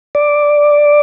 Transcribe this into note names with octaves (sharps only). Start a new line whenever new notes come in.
D5